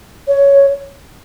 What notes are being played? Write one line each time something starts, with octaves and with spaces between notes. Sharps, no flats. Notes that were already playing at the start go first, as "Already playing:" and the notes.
C#5